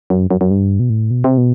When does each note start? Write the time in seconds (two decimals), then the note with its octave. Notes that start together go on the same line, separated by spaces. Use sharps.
0.10 F#2
0.31 F#2
0.41 F#2
0.51 G2
0.80 B2
0.90 A2
1.11 B2
1.24 C3
1.38 B2